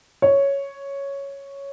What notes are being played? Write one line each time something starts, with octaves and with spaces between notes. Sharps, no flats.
C#5